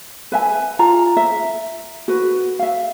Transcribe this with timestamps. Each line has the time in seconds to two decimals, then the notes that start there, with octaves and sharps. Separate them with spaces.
0.32 B4 E5 G#5
0.79 F4 A#5
1.17 E5
2.08 F#4 B4
2.59 E5 F5